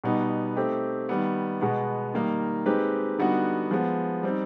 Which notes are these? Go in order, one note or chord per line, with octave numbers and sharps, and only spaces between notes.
B2 G3 B3 D#4
A3 C4 D#4 G4
D#3 G3 B3
B2 G#3 B3
D#3 G3 A#3 D#4
G#3 C4 D#4 G4 B4
D3 G3 B3 D#4 F#4
F3 G#3 B3
G3 C4 D#4